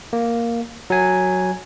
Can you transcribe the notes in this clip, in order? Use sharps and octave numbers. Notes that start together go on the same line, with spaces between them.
A#3
F#3 G#5